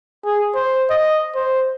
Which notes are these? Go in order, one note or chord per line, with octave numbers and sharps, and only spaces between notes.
G#4
C5
D#5
C5